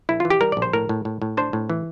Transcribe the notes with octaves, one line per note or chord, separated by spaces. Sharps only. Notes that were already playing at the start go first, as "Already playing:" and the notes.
A#1 E4
E3 F4
G4
G3 A#4
A#1 D5
C5
A2 A#4
A2
A2
A2
D4 C5
A2
E3